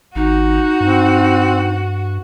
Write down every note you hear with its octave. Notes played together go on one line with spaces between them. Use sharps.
G#1 D#4 F#4
G2 C4